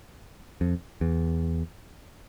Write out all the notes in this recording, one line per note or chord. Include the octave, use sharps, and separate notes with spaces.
F2
E2